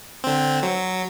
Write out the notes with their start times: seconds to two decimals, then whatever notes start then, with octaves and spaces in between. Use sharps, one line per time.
0.24 D3 C4
0.63 F#3